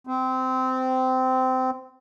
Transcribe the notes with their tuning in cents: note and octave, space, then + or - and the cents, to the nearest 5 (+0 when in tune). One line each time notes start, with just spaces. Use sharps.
C4 -20